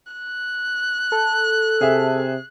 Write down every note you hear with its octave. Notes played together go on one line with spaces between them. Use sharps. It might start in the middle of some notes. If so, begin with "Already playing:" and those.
F#6
A4
C3 G#4 E5